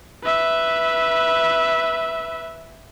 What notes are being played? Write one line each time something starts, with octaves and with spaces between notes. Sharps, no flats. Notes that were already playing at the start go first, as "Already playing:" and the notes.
B4 E5